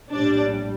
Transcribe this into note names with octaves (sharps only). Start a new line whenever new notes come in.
A#1 A2 G3 D4 D5